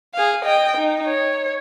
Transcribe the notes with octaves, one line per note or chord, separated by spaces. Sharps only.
G#4 F5
D#5 G5
D#4
C#5